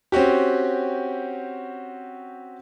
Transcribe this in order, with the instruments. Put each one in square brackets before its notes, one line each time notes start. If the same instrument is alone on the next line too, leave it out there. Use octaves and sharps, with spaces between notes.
[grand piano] C4 C#4 F#4 G4